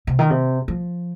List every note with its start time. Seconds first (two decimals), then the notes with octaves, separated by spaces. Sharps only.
0.07 C3
0.19 D#3
0.30 C3
0.68 F3